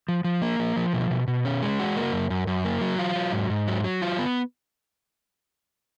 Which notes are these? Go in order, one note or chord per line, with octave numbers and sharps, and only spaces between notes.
F3
F3
A#3
F3
F3
B2
B2
B2
C#4
G#3
F#4
A#3
F#2
F#2
F#2
A#3
F#3
F4
F#3
G#2
G#2
F#3
F#3
F4
B3